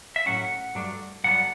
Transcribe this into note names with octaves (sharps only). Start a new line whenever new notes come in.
E5
A2 F#3 C#4 F#5
G2 F#3 A3 D4
G2 D3 F#3 B3 D4 F#5